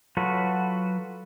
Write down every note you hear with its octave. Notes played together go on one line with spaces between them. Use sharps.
F#3 F4 F#4 A4 B4